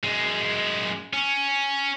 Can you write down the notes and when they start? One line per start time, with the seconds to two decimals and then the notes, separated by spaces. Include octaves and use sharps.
0.04 F#2 G#3
1.14 C#4